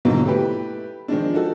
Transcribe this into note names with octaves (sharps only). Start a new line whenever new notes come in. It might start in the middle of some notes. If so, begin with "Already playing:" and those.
G#2 B2 D3 E3 F#3 A#3
A3 E4 G4 B4
D#3 F3 G#3 D4
D#4 F#4 A4